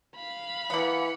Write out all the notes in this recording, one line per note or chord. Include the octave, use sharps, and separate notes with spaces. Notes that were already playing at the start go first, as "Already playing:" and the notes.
F5 B5
E3 A#3 B3 C#7